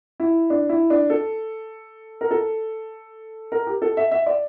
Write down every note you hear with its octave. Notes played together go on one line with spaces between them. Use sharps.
E4
D4
E4
D4
A4
A#4
A4
A#4
G4
A4
E5
E5
D5